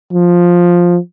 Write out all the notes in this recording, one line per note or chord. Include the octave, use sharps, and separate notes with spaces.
F3